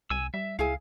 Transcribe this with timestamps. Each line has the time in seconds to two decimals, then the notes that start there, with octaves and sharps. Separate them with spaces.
0.10 C2 G#5 E6
0.34 G3 E5
0.59 C#2 E4 G#4 F5 G#5